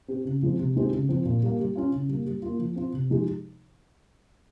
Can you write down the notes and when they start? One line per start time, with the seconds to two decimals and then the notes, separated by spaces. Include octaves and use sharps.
0.08 C4 G4
0.25 C#3
0.42 F3 G#3 C4
0.58 C3
0.75 D#3 G#3 C4 G4
0.93 C#3
1.09 F3 C4
1.25 A#2
1.43 G3 A#3
1.59 G3
1.75 C#4 F4
1.92 C#3
2.09 G3 A#3
2.25 G3
2.42 A#3 F4
2.59 F3
2.76 C4 F4
2.93 C3
3.10 F3 G#3 D#4 G4